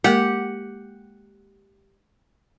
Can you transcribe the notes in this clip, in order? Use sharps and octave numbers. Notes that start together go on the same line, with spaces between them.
G#3 A#3 G4 A#4 F#5